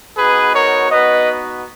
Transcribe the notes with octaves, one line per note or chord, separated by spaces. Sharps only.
B3 D#4 F#4 G#4 B4
A#4 C#5
B3 D#4 F#4 B4 D#5